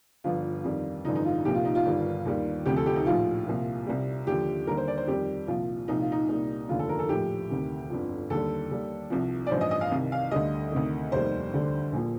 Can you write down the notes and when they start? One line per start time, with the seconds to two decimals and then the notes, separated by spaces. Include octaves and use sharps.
0.24 G1 G2 F3 F4
0.64 F2 D#3 G3
1.05 A1 G2 D3 F3 D#4
1.15 D#4
1.25 F4
1.45 C2 A#2 F3 G4
1.55 F4
1.65 D#4
1.75 F4
1.85 G1 G2 D#3 G3
2.26 D#2 D#3 G3
2.66 D2 C3 F3 G4
2.76 A4
2.86 G4
2.96 D#4
3.06 A#1 A2 F3 F4
3.46 C2 A#2 F3
3.87 C2 C3 G3
4.27 D#2 D3 F3 G4
4.67 D#2 D3 G3 A#4
4.77 C5
4.88 D5
4.97 C5
5.08 F2 D#3 G3 G4
5.47 C2 A#2 F3 F4
5.88 C2 A#2 F3 D#4
6.01 F4
6.12 D#4
6.29 C2 A#2 G3
6.68 F1 D#2 D3 F4
6.79 A4
6.89 A#4
6.99 A4
7.09 A#1 A2 F3 G4
7.50 D2 C3 D#3
7.90 G1 F2 D3 F3
8.30 D#2 D3 G3 A4
8.71 D#2 D#3 G3
9.10 C2 C3 F3
9.46 D5
9.51 A1 G2 F3 C5
9.61 D#5
9.71 D#5
9.81 F5
9.91 C2 C3 D#3
10.12 F5
10.31 D2 D3 G3 D#5
10.72 D2 C3 D#3
11.12 F1 D#2 D#3 G3 C5
11.53 D2 D3 G3
11.92 A#1 A#2 F3